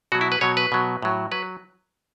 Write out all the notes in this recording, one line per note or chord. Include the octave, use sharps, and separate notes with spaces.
B2 F#3 F#4
E4
B4
B2 F#3 C#5
B4
B2 F#3
A2 F#3
F#3 B4